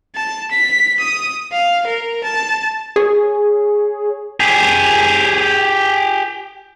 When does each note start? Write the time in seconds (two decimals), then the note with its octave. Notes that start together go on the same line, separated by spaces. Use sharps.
0.15 A5
0.51 B6
1.00 D#6
1.52 F5
1.86 A#4
2.24 A5
2.96 G#4 C#5
4.40 G4 G#4